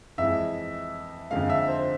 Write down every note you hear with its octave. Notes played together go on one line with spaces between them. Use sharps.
F2 E3 G#3 E5
F2 D3 G#3 F5
E5
C5